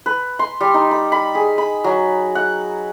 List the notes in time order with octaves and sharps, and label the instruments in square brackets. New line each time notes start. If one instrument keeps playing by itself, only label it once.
[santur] B4
C6
G3
D#4
B5
B5
G#4
B5
F#3
F#5